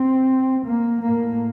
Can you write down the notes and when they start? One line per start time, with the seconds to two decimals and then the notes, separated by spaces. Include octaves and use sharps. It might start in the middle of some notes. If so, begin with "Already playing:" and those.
Already playing: C4
0.64 A#3
1.02 A2 A#3